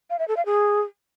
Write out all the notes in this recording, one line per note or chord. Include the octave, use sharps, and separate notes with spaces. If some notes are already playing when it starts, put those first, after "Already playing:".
F5
E5
A4
F5
G#4